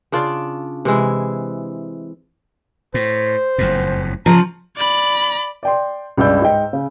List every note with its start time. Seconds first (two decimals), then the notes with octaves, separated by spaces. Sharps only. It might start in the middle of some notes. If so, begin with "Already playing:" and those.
0.12 C#3 D4 F4 D5
0.85 C3 E3 G#3 E4
2.94 A2 C5
3.58 F#1 F2 A2
4.26 C#3 F3 A#5
4.76 D5 B5
5.63 D5 G5 C6
6.17 C#2 G2 D5 E6 G6
6.42 G#2 D#4 G5
6.73 C#3